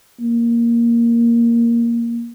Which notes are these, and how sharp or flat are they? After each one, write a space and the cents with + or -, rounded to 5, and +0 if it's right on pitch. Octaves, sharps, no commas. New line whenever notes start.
A#3 +5